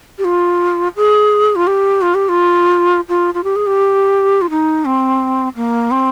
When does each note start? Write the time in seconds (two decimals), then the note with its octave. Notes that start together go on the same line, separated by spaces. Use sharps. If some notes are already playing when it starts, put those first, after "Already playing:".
0.18 G4
0.24 F4
0.96 G#4
1.56 F4
1.67 G4
2.02 F4
2.14 G4
2.29 F4
3.09 F4
3.34 F4
3.44 G4
3.56 G#4
3.66 G4
4.42 F4
4.50 D#4
4.85 C4
5.56 A#3
5.91 C4